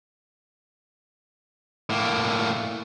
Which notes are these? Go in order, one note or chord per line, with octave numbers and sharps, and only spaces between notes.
A2 A#3